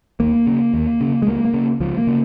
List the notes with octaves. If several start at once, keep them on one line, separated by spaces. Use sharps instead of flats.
D#2 A#3
C#3
D#2
C#3
G#3
C#2 A#3
A#3
C#3
C#2 F3
A#3
C#3